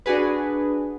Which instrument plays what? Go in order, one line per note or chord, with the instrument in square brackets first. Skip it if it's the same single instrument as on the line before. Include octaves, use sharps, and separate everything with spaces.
[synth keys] D4 F#4 G#4 B4